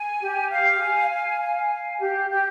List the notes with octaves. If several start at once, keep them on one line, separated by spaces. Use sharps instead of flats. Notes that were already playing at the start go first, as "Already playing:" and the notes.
Already playing: G#5
G4
F5
G#5
F5
G#5
F5
G4
G4